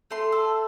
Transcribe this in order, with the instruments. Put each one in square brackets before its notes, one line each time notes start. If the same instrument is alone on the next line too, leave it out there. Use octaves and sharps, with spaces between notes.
[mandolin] A3 C6
A4